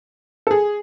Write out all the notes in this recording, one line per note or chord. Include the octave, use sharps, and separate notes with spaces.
A4
G#4